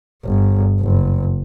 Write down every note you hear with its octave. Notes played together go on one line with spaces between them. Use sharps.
G1
F#1